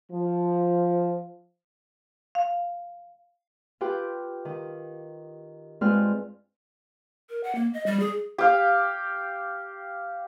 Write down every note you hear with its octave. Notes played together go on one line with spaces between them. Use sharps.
F3
F5
F4 G4 B4 G5
D#3
G2 G#3 C4 F4 B4 F6
A#4
F#5
A#3
D#5
G3
G#4
G4 F5